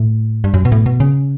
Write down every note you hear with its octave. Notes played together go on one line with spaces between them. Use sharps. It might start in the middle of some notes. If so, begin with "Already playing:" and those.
Already playing: A2
G2
F#2
B2
A2
B2
C#3